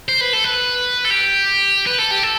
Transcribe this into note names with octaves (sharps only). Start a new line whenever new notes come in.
C5
B4
A4
B4
A4
G4
B4
A4
G4
A4